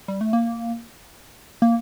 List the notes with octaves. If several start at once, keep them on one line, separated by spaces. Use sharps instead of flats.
G3
A3
A#3
A#3